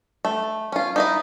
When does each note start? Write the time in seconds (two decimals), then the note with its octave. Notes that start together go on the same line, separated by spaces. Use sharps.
0.25 A3
0.72 C#4 F4
0.96 D#4 E4 D#5